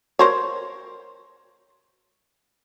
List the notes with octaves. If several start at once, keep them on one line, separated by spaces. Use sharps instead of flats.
A#4 C5 C#5